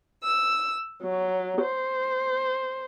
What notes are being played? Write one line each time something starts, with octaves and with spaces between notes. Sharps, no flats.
E6
F#3
C5